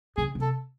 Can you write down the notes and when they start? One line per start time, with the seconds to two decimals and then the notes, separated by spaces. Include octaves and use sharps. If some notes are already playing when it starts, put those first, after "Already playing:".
0.17 C#3 G#4
0.35 C3
0.42 A4